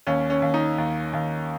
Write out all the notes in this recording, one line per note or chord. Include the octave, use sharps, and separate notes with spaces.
D#2 C#4
C#4
D#2
D#4
D#2
D#2